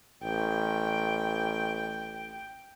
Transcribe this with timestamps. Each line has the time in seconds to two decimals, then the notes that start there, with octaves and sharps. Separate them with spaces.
0.23 A1 G5